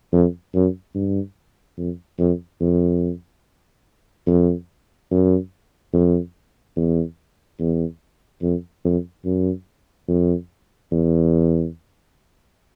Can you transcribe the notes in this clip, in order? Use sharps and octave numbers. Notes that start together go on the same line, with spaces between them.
F2
F#2
G2
F2
F2
F2
F2
F#2
F2
E2
E2
F2
F2
F#2
F2
E2